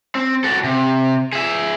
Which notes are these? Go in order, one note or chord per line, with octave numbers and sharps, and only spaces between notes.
C4
F#4 A4
C3
G#4 E5